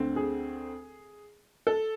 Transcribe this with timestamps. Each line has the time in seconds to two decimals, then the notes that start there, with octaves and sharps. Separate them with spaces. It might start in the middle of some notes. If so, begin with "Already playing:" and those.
Already playing: D2 D3 A3 C4
0.16 G#4
1.67 A4